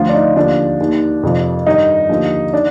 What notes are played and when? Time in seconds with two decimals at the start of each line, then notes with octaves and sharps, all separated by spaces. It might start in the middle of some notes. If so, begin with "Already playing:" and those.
Already playing: D2 D3 F3 F4
0.09 D4
0.15 D#4
0.36 D#2 D3 F3 D4
0.80 D#2 D#3
1.23 F2 C3 F3
1.66 G2 D#3 D#4
2.09 D#2 D3 F3
2.53 D#3 D4